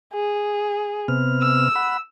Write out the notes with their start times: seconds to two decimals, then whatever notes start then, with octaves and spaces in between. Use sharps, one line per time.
0.13 G#4
1.08 C3 B3 F6
1.42 E6
1.76 F#5 B5